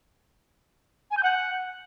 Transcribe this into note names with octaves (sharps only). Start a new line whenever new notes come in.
G#5
G6
F#5